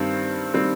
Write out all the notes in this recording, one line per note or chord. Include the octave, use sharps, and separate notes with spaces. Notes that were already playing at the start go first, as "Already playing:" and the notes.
Already playing: G2 D#3 G3 C4
D#3 G3 C4